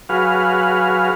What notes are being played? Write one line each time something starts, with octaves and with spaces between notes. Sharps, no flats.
F#3 F#4 G#4 B4 F5 F6